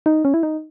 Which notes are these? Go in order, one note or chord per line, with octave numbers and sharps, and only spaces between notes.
D#4
C#4
E4
D#4